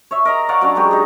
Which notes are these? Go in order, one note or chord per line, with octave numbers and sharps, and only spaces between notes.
C#5 E5
A#4 D#5 A#5
C#5 D5 F5 F#5
F#3 C#4 D4
F#3 G#3 G4 B4
D#4 G#4